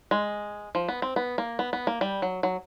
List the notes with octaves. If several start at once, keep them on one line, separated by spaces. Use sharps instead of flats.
G#3
F3
B3
C4
B3
A#3
B3
B3
A#3
G3
F#3
F#3